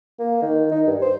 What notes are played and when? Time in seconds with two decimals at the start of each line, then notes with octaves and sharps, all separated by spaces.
0.19 A#3
0.42 D#3
0.72 D#4
0.87 G2
1.02 C5